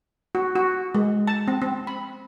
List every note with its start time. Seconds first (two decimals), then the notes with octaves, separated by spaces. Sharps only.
0.35 F#4
0.56 F#4
0.95 G#3
1.27 A5
1.48 C4
1.62 C4
1.87 B5